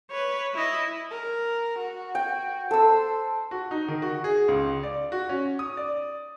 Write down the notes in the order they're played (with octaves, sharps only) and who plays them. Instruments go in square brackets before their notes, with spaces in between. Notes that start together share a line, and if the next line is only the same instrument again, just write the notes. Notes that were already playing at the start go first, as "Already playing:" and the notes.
[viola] B4 C#5
E4 D#5
[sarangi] A#4
F#4
[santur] G5
[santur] A4 E6 [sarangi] C5
[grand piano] F#4
D#4
D#3
F#4
G#4
C#2
D5
F#4
C#4
D#6
D5